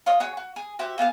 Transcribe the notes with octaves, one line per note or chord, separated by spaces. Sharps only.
F4 C#5 D#5
F#4 G#4 C#5
F#4
G#4
F#4 G4 C5 E5
A#3 B3 G#4 F5